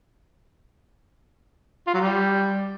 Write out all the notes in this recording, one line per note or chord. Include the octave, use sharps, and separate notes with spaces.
F4
F#3
G3